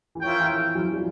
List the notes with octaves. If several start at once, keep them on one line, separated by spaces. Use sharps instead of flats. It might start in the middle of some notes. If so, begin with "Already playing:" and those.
E3
F3 F4 A#4 C#5 E5 G5
E3
F3
E3 F#3
F3 G3